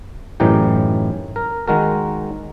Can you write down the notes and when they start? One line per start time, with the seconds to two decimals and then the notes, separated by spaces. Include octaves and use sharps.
0.40 F#2 A2 E3 D#4 G4
1.36 A#4
1.68 D#3 G#3 F#4 A#4